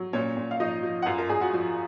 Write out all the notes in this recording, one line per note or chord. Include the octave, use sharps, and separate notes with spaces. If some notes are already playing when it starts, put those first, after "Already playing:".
Already playing: F#3
A#2 C#4 C#5
A#2
F5
F3 D#4 D#5
F3
F#5
F#2 F4 F5
A#4 A#5
F#2 G#4 G#5
F#4 F#5
F3